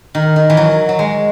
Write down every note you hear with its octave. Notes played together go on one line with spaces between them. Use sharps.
D#3
D#3
E3
F#3
F#3
G#3